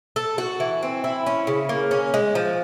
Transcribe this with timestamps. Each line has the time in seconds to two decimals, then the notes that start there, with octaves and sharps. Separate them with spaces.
0.16 A4
0.38 F#4
0.60 E3
0.83 C4
1.04 E4
1.26 C#4
1.47 C#3
1.69 A#3
1.91 C#4
2.14 G#3
2.35 F3